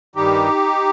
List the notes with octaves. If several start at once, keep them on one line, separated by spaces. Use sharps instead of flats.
G2 D#3 G3 D#4 G4